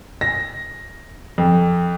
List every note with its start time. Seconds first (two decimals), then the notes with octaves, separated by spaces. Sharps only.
0.21 A#6
1.38 F2